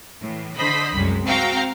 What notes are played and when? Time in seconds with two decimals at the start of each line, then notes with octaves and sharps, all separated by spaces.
0.22 A2 E3
0.57 D3 C5 D#5 B5
0.94 C2 F#2 G#3
1.25 C4 F#4 F5 G5 A#5